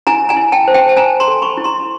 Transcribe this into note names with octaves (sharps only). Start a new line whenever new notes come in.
E4 G#5 A#5
G#5 A#5
E4
G5 A5
C5
G5 A5
A5
C5 G#5 A#5
A#5 C6
A4
B5 C#6
E4
A#5 C6